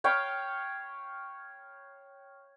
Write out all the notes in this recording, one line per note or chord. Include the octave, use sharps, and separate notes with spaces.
C#5 F5 G5 B5